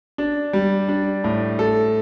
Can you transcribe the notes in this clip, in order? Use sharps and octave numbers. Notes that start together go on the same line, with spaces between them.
D4
G3
D4
A2
A4